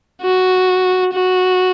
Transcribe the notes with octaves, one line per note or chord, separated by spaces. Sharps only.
F#4
F#4